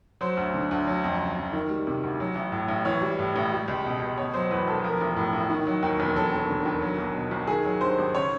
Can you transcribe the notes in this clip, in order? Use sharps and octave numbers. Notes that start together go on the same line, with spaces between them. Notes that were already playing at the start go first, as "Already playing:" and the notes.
F#3 C5
D2
D3
D2
F#3
F2
C#3
F2
D#3
G3
C3
D2
F#3
A1
A2
A1
E3 C#5
G3
A2
A1
G3
C#2
B2
C#2
B2 C#5
F#3 C5
E2 B4
E1 A4
F3 A#4
A1
A2
A1
D#3
F#3
D#2
E1
F#3 A4
D#2
D3
D#2
F#3
B1
B2
B1
D#3 G#4
F#3
G2 C5
G#1
C#3 C#5